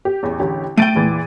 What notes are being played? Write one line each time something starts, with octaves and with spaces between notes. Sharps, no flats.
G4
A1 E2
A1 D3 G4
A3 G5 A6 D7 D#7
E2 A#2 E3